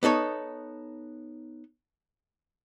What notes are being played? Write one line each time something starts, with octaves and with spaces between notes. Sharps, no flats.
B3 D#4 A4 C#5